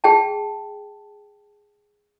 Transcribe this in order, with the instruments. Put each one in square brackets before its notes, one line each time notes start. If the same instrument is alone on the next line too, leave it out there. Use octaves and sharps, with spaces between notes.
[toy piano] G#4 G5 A5